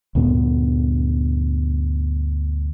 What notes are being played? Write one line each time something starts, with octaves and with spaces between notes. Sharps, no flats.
D2 G2 A#2 B3